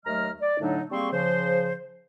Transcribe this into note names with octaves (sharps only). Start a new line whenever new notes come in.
D#2 F#3 A3 D#5 A#5 F6
D5
A2 D3 F#3 A3 D4 D#4
G3 A#3 C4 G#4 C6 C#6
C#3 F3 C5